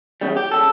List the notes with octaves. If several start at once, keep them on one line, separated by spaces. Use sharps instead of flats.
E2 C#3 G3
G4
C#3 G3 A4